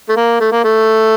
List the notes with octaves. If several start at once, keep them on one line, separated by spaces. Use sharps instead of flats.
A3
A#3
A3
A#3
A3